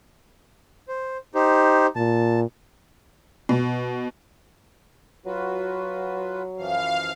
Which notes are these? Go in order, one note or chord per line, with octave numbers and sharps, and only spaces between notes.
C5
D#4 G4 C5
A#2 A5
B2
F#3 F4 F#4 B4
F#2 E3 F3 F5